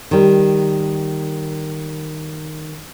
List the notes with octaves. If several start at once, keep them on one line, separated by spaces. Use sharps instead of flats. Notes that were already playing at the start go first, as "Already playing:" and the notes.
D#3 G3